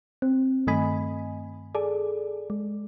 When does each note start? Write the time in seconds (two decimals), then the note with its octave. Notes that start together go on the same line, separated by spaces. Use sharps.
0.22 C4
0.67 G2 D#3 A3 D#5 G#5 B5
1.75 G#4 A4 D5
2.50 G#3